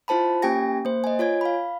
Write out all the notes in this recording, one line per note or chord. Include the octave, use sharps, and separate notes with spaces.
E4 F4 C5 A5 B5
A#3 C#4 G4 G5 G#5 A#6
A#3 C5
D#5 G#5
F4 C#5 G#5 G#6
F5 B5